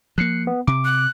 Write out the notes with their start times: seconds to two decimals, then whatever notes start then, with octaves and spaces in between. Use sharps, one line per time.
0.18 F3 A#3 F#6 C7 C#7
0.47 B3
0.67 C3 D6
0.85 F#6